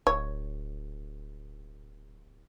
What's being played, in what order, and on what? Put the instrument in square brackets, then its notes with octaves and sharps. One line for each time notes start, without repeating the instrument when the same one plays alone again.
[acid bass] D1 [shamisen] C#5